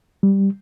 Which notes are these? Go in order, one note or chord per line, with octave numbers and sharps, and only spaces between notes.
G3